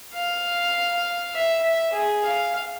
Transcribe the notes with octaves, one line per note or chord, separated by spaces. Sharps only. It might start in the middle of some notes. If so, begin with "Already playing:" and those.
F5
E5
E5
G#4
F5